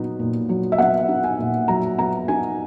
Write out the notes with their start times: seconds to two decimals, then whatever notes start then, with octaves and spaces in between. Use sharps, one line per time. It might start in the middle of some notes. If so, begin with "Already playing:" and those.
Already playing: A#2 F#3 B3 D#4
0.19 A#2
0.49 F#3
0.72 E5
0.78 B3 F#5
1.08 D#4
1.24 G#5
1.39 A#2
1.68 F#3 A#5
1.98 B3 A#5
2.28 D#4 G#5